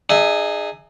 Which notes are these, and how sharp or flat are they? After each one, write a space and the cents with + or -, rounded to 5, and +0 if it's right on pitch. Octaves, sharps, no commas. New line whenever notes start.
D#4 -45 G#4 +0 E5 +0